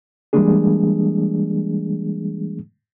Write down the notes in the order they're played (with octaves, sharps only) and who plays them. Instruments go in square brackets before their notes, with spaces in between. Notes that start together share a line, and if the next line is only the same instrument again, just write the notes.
[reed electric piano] E3 G3 G#3 A#3 D4 G#4